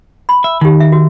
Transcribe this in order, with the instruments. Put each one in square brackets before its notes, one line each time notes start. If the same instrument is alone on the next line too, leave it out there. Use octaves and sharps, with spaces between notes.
[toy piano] B5
[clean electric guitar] E5
[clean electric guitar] D#3 [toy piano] D#4 G4
[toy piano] E5
F#4